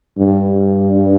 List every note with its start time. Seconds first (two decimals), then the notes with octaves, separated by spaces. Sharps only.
0.18 G2